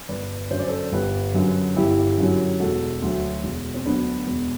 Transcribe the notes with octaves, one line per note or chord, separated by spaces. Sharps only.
G1 B4 D5
F#2 D3 F#3 C5
D5
A4 C5
G1 G4 B4
F#2 D3 F#3
G1 E4 G4
F#2 D3 F#3
E1 F#4 A4
D2 D3 F#3
E1
C4
D2 D3 F#3 B3 D4
E1 B3